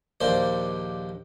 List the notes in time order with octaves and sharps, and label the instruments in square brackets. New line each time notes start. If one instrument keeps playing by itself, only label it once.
[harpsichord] A#1 D#2 A#3 C5 D5